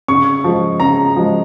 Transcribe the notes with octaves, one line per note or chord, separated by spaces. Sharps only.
C#3 C#6
F3 G#3
C#3 A#5
F3 G#3